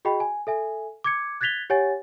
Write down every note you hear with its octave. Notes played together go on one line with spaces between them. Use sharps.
F#4 G#4 D#5 G5 B5
G#5
A4 E5 G#5
D6 G#6 C#7
F#6 G#6 A6 B6 F7 G7
G4 C#5 F#5 G#5 A6